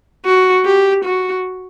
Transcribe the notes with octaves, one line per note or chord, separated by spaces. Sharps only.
F#4
G4
F#4